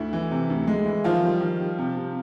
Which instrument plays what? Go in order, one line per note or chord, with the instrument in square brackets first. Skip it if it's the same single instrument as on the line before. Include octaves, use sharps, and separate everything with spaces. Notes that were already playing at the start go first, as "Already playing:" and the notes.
Already playing: [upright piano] D2 E4
E3
C3
D2
G#3
E3
D#3 F3 F4
G3
D#3
G3
C3
C3